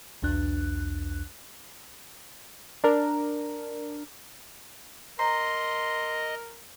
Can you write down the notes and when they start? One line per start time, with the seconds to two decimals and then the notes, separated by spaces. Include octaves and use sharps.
0.22 B1 E2 D4 F#6
2.84 D4 A#4
5.19 A#4 D#5 A#5 C6